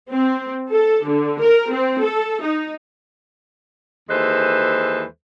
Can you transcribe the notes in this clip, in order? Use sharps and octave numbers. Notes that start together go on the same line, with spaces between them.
C4
A4
D3
A#4
C4
A4
D#4
D#2 E3 G#3 A4 B4 C5